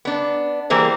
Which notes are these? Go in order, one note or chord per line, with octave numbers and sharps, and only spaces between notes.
B3 D4
E3 G3 A#3 G#4 C5